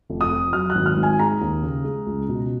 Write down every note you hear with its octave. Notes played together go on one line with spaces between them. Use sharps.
F1
D#6
F2
F#3 F6
F#6
G#1
F6
G#2
G#5
G#3 A#5
D#2
C#3
G#3
C#2
B2